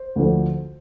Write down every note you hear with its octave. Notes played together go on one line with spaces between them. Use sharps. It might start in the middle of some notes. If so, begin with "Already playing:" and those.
Already playing: C5
D2 D3 F3